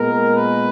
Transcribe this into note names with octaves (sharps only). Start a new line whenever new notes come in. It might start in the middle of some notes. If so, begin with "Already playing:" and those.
Already playing: A#2 G#3 B3 A#4
B4